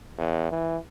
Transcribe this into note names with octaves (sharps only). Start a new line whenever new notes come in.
E2
E3